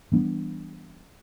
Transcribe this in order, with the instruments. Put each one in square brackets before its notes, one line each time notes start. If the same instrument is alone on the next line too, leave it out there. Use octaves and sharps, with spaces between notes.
[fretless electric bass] E3 G3 B3 D4